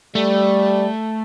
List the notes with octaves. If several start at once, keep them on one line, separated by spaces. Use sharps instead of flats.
G3 A3